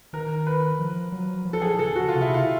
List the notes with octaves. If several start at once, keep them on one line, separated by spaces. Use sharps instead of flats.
D#3 A#4
B4
F3
F#3
F3
A4
G#4
C#3 A4
F#4
C3 F4
E4
F4